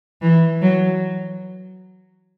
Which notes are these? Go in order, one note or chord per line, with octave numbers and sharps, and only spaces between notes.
E3
F#3